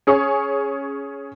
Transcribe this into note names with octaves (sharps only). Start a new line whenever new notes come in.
C#4 G#4 C#5 C#6